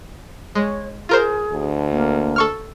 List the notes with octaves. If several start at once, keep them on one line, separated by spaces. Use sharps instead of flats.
G#3 C#5
F4 G#4 A#4 C5
D2
A#3
A4 C#6 F6